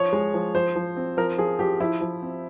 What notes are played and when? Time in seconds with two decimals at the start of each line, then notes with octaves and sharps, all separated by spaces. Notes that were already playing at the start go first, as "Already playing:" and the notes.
Already playing: F3 C#5
0.13 G#3
0.34 F3
0.55 F3 C5
0.75 F3
0.97 C4
1.17 F3 A#4
1.38 F3 G#4
1.59 F3 G4
1.80 F3 E4
2.01 F3
2.22 C4